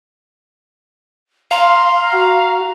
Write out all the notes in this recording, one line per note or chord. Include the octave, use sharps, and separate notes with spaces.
F5 A#5 C6
F#4